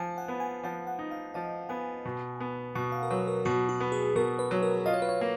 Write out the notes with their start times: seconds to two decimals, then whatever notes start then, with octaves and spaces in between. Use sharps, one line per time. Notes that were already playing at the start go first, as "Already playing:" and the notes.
Already playing: F3 G#5
0.18 F#5
0.28 B3
0.40 G#5
0.63 F3 F#5
0.87 F#5
0.99 D#4
1.11 F5
1.34 F3 D#5
1.69 B3 G#5
2.05 B2
2.40 B3
2.75 B2 F#5
2.92 F5
3.03 A#4
3.11 F#3 B4
3.28 A#4
3.45 B2 F#4
3.69 F#4
3.80 B3
3.92 G#4
4.16 B2 A#4
4.39 B4
4.51 F#3
4.63 A#4
4.86 F4 D#5
4.94 C#5
5.02 B4
5.09 C#5
5.21 A#3